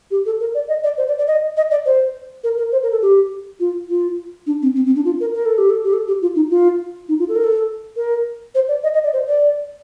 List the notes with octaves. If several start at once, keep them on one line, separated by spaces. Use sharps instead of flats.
G4
A4
A#4
D5
D#5
D5
C5
D5
D5
D#5
D#5
D5
C5
A#4
A#4
C5
A#4
A4
G4
F4
F4
D4
C4
C4
C4
D4
F4
A#4
A#4
A4
G4
A4
G4
A4
G4
F4
D#4
F4
D#4
F4
A4
A#4
A4
A#4
C5
D5
D#5
D#5
D5
C5
D5